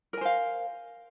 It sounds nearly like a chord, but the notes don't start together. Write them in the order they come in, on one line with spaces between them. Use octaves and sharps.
A#4 G#5 C5 F5